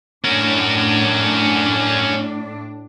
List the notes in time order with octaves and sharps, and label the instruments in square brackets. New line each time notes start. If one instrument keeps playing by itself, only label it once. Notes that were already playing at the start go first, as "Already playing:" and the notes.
[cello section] A2 D4 [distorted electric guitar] C#4 A#4